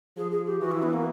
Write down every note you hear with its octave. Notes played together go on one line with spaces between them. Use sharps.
F3 G#4
G#4
G4
E3 F#4
E4
B3
A#3